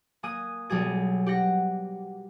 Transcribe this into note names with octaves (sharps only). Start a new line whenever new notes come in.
A#3 G#5 D#6 F#6 D#7
B1 G3 G#4 G#5
G4 F#5 A#6